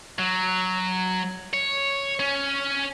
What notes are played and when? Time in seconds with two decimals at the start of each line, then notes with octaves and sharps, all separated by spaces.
0.19 F#3
1.53 C#5
2.20 C#4